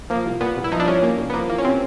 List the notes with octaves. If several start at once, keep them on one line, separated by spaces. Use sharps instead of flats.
F3 A#3
C2
A#2 B3
C2
E4
F3 D#4
D4
C2 C#4
A#2 A#3
C2
B3
F3 A#3
E2 A#3
C#4
C3 C4